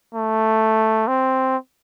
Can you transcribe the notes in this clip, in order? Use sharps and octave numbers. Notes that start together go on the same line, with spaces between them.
A3
C4